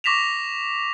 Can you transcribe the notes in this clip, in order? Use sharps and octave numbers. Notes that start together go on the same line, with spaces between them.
C#6 D6 A#6 B6 E7 F7